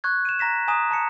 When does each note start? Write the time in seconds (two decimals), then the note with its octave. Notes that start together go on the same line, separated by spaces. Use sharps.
0.04 C#6 F#6 G#6
0.25 D#7 E7
0.39 A#5 A#6 B6 E7
0.68 G#5 A#5 D#6 E7
0.91 A5 A#5 C#7